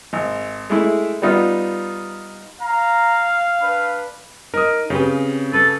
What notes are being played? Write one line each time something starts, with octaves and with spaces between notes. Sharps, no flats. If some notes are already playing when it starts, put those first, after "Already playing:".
G#1
G#3 A3 E4
G3 B3 D#4 F4
F5 A#5
D4 B4 B5
D#4 A#4 D#6
C#3 C4 G4 B4
A4 B4